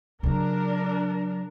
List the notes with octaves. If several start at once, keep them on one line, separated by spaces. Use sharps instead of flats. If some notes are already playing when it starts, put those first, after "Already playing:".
C#3 F#3 D4 A#4